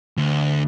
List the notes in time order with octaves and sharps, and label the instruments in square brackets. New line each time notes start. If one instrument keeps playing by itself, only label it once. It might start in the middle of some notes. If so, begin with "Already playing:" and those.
[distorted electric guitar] D2